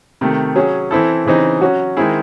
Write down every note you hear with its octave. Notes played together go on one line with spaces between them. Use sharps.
C3 D#3 A3
F#3 C#4 G#4
E3 C4 E4 A4
C#3 E3 C4 D#4
F#3 C#4 F#4
D#3 G#3 C4 E4 G#4